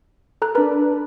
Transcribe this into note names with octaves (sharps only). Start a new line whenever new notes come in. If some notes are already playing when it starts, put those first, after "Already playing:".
A4 A#5 F#6
D4 A#4 B4 A#5